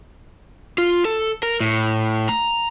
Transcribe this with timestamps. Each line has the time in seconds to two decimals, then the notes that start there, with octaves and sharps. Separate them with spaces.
0.78 F4
1.05 A4
1.43 A#4
1.61 A2
2.29 A#5